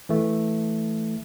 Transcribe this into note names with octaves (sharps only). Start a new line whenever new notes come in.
E3 A3